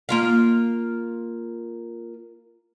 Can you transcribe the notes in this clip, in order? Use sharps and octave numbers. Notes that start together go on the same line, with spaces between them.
A#3 F4 F5